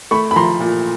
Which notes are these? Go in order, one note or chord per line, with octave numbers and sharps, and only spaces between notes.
A3 B5 C#6
B5
F3 A#5 C6
A#2